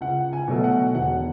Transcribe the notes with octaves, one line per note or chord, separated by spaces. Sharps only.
C#2 F#5
G#5
B2 F#3 A3
F#5
E1 F#5